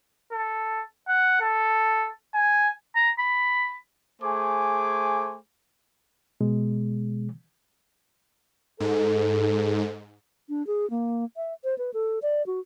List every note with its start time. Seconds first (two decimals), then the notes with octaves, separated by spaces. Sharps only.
0.32 A4
1.09 F#5
1.41 A4
2.34 G#5
2.96 A#5
3.18 B5
4.22 A3 G#4 C5 G#5 D6
6.41 B2 G#3
8.80 G#2 A4
10.49 D4
10.67 G#4
10.90 A#3
11.37 E5
11.64 C5
11.78 B4
11.94 A4
12.22 D5
12.47 F#4